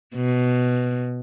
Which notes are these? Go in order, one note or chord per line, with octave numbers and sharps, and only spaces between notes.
B2